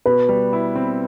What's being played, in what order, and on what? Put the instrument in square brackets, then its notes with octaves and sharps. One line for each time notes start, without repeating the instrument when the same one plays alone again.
[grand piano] B2 [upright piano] B4
[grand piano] G3
E4
C4